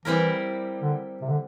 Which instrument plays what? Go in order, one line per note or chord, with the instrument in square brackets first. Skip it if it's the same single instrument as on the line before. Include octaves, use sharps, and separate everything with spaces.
[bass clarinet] E3 [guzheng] G3 C4 E4 A#4
[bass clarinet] D3
C3
D3